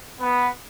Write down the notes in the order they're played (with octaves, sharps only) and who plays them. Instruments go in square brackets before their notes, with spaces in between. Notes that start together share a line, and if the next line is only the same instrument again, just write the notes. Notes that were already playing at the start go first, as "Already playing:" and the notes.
[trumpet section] B3